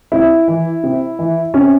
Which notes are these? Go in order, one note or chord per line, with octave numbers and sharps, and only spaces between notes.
C3 E4
E3
C3
E3
C3 C#4